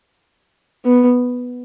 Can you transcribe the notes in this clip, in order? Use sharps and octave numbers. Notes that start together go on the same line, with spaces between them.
B3